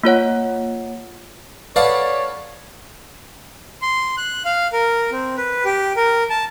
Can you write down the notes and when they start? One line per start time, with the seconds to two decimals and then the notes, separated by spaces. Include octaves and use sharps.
0.04 A#3 F4 C#5 F#5
1.76 A4 B4 C#5 D5 F5 F#5
3.82 C6
4.17 F#6
4.45 F5
4.73 A#4
5.12 C4
5.37 B4
5.65 G4
5.97 A#4
6.30 A5